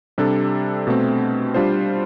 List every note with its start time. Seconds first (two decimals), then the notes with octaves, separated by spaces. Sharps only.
0.18 C3 G3 D4 A4
0.87 B2 A3 C4
1.54 G3 D4 F4 C5